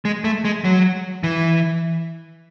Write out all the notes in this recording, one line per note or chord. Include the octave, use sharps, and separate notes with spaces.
G#3
A3
G#3
F#3
E3